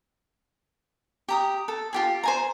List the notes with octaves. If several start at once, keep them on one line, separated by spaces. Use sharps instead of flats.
G4 A#5 D#6
A4
F4 G4 G#4
C5 G#5 A#5